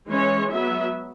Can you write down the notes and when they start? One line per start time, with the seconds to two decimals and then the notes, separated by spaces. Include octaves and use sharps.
0.09 E3 G#3 C#4 C#5
0.51 F#3 B3 E5